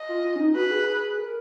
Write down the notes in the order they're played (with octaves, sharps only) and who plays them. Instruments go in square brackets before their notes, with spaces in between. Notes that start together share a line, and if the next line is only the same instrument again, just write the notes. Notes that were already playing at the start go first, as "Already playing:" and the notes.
Already playing: [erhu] D#5
[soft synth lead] F4
F4
C#4
D#4
[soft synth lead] F#4 [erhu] B4
[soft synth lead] G#4
A#4